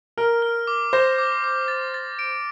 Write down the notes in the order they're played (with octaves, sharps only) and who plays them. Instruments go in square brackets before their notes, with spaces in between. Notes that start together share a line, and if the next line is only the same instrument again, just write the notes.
[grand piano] A#4 [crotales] F6
[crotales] F6
D6
[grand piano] C5 [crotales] A#6
[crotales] D6
D6
A6
A6
D7